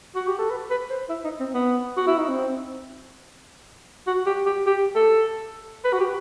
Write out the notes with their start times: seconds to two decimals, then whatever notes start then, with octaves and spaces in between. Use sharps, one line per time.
0.15 F#4
0.27 G4
0.38 A4
0.50 B4
0.70 B4
0.90 C5
1.09 E4
1.24 D#4
1.40 C4
1.54 B3
1.97 F#4
2.07 E4
2.18 D#4
2.28 C4
4.07 F#4
4.26 G4
4.46 G4
4.66 G4
4.96 A4
5.84 B4
5.92 F#4
6.00 G4